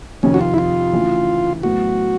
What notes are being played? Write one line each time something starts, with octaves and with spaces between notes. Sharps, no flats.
F2 C3 D#3 C#4
F#4
F4
E4
F4
D2 C#3 E3
A2 F#3 B3 F#4